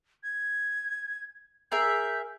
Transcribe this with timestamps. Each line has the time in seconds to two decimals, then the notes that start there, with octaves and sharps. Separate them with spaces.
0.23 G#6
1.72 G#4 A#4 E5 G6